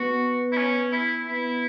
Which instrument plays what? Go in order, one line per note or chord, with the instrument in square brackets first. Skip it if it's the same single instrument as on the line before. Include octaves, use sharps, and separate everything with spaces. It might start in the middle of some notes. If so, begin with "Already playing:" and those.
Already playing: [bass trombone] B3 [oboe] F#4
[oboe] E4
C#4
E4
[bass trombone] B3 [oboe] E4